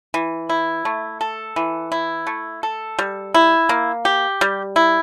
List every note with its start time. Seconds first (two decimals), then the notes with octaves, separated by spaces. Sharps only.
0.14 E3
0.49 E4
0.85 A3
1.21 A4
1.56 E3
1.92 E4
2.27 A3
2.63 A4
2.99 G3
3.34 E4
3.69 A#3
4.05 G4
4.41 G3
4.76 E4